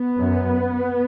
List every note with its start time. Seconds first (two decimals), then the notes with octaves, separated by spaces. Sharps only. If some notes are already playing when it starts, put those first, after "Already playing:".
Already playing: B3
0.18 F#2